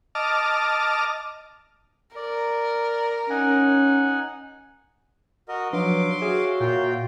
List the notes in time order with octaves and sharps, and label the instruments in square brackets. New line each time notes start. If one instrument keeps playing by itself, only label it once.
[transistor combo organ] D#5 A5 D6 F6
[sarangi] A#4 [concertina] D5
[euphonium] C#4 [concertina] D#4 F#5 G#5
[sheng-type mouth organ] F#4 A#4 D#5
[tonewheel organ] F3 D4 B4 [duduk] F#3 [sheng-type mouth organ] F5 C6 D6
[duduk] F#4 [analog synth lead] G#4 [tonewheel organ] C#5 E5
[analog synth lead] A#2 [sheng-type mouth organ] F4 G5